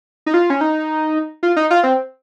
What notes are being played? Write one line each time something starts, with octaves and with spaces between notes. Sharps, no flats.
D#4
F4
C#4
D#4
F4
D#4
F4
C4